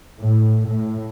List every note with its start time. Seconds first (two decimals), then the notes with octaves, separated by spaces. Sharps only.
0.19 A2
0.67 A2